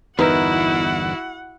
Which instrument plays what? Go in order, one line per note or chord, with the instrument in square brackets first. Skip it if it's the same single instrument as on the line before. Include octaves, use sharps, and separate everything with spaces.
[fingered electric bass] G1 E2 [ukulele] D#4 A#4 B4 [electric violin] E4 F#4 [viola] F#5